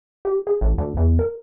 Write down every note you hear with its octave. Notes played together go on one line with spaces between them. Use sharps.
G4
G#4
A1
D2
E2
A#4